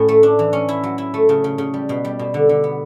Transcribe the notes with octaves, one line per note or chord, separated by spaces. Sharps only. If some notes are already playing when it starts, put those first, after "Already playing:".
Already playing: A2 C#4
A3
D4
E3
C#4
E4
F#3
E4
A3
C#3
C#3
C#3
G3
B2
G3
B2
D3
D3
B3